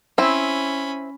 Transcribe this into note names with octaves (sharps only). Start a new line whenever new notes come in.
C4 C#4 E4 B5